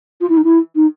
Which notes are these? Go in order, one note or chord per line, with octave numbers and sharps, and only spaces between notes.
F4
E4
D#4
E4
D#4